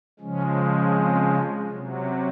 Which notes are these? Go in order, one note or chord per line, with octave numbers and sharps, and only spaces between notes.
C#3 F3 G#3 C#4
C4
C3 F#3 C#4